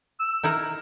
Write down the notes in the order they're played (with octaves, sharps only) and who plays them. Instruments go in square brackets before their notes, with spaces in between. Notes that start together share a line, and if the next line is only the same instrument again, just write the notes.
[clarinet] E6
[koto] D#4 E4 A#4